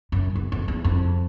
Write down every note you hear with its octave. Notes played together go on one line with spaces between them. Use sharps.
F#2
E2
F2
E2
F2